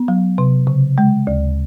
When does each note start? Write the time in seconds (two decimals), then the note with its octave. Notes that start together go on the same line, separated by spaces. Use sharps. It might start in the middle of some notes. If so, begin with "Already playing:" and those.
Already playing: B3
0.08 F#3
0.38 C3
0.67 C#3
0.98 G#3
1.27 D2